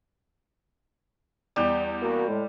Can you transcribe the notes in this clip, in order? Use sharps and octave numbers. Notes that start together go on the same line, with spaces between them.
E2 G3 G6
A#3 F#4
A2 G#3